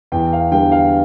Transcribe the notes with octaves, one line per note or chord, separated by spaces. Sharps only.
E2 G5
F5
D3 G3 B3 G5
F5